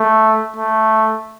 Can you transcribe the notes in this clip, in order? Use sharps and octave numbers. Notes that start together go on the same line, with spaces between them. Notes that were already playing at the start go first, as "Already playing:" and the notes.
Already playing: A3
A3